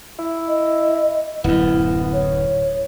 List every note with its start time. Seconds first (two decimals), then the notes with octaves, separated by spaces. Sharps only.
0.19 E4
0.48 D#5
1.44 D1 F#2 B3 E4
2.12 C#5